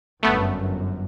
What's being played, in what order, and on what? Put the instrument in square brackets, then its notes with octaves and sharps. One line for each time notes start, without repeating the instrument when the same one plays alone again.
[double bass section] G1 F#2 [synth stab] A3 B3